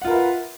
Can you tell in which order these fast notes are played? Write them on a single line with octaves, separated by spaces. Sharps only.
F#5 F4 A#4 B4 E5